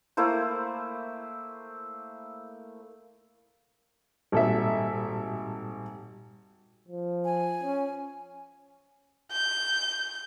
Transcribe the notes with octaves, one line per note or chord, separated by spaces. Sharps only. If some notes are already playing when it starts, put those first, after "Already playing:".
A3 A#3 E4 C5
G#1 A#2 G3 G4 A4 E5
F3
G#5
C#4
G6